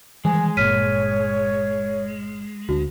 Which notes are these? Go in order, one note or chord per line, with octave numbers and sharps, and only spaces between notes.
D#3 E3 G3 G#3 G#5
G1 A#2 C#5 F6 B6 D#7
D2 D4 F#4